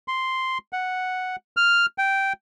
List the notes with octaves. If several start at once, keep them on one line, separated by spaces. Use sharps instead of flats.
C6
F#5
F6
G5